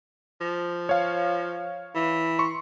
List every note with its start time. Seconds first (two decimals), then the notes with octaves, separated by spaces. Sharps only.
0.41 F3
0.89 C#5 F5
1.95 E3
2.39 C6 C#6